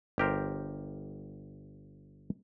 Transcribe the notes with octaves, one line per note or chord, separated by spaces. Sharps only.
G1 G4 A#4 C5